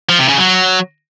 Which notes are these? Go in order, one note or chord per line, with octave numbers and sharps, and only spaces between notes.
F3
C3
C#3
F#3